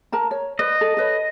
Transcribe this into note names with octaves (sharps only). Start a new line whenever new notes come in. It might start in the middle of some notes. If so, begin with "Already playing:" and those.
A#4 A5 A#5
C#5
B4 D5 D#5
A4
A4 B4 C#5